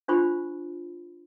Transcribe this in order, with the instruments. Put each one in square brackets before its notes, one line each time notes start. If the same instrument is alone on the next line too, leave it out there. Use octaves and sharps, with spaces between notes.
[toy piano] D4 F4 C5 B5 C#6